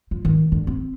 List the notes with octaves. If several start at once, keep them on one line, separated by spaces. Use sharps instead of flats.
F3
D#3
D3
C4